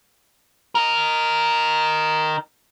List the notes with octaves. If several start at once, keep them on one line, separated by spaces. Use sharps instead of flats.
D#4 A#4